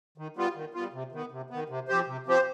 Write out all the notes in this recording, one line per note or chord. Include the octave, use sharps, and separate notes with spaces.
D#3
G3 B3 F4
D#3
G3 B3 F4
C3
D#3 B3
C3
D#3 B3
C3
F3 C4 G4 C5
C3
F3 C4 G4 C5